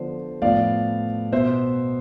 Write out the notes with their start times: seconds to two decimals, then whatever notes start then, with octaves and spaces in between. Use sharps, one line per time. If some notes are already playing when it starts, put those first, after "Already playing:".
Already playing: D3 F3 B3 C5
0.42 A2 F3 B3 D5 F5
1.32 B2 B3 C5 E5